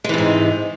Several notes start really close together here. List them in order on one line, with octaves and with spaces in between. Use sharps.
G#3 E3 C3 G#2